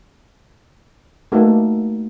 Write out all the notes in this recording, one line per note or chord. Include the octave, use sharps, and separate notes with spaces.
A3 A#3 D#4 F#4 A4